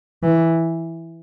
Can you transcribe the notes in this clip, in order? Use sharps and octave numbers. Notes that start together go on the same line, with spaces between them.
E3